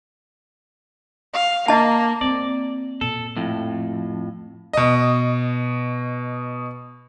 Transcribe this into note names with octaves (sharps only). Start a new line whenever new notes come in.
F5
A#3 D#5 A5
A#3 C4 D5
A#2 A4
F2 A2
B2 D#5